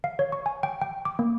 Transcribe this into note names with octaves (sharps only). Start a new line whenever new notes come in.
F5
C#5
C#6
G#5
G5
G5
D6
A#3